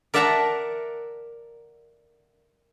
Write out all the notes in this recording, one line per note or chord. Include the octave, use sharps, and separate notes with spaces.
A#4 D5 E5 F#5 A5 A#5